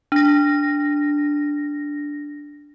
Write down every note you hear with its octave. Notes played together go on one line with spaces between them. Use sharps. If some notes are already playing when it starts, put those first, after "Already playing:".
D4 A#6